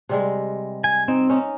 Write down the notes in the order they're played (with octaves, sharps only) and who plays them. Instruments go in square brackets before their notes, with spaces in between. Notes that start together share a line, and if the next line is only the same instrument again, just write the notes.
[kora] C3 G3 G#3
[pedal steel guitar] G#5
[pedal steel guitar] C4 [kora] D#4
[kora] C#4 D#4